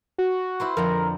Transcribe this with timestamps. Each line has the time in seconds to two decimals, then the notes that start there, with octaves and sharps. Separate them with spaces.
0.18 F#4
0.60 E4 B4 C5
0.77 F2 D3 A#4